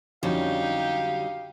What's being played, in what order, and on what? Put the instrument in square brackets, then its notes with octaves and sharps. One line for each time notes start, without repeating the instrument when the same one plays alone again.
[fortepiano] F2 C#4 [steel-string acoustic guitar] D3 F#3 G3 [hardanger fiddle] D#4 G4 [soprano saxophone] F5